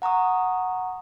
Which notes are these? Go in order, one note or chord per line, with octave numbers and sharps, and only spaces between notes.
F#5 A#5 C#6 D#6